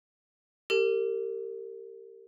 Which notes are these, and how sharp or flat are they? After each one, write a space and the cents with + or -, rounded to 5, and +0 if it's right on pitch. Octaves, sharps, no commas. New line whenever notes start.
G4 +0 A#4 -35